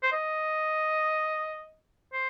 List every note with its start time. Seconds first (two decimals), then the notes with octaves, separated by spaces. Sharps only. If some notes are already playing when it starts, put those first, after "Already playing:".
0.03 C5
0.12 D#5
2.13 C5